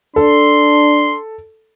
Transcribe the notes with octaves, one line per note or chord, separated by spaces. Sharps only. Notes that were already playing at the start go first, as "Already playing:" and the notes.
D4 A4 C6